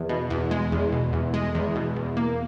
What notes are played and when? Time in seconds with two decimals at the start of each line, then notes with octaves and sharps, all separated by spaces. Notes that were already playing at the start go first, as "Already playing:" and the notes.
Already playing: E2
0.09 B2
0.30 E2
0.51 G#3
0.72 E2
0.92 B2
1.13 E2
1.34 G#3
1.55 E2
1.75 B2
1.96 E2
2.17 A#3